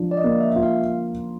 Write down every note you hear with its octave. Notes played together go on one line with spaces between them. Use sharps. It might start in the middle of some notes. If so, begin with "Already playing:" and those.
Already playing: F3 D4
D5
D#5
A#3
E5
F4 E5
F5